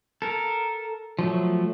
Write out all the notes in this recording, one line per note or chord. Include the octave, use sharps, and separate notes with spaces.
A4 A#4
F3 F#3 A3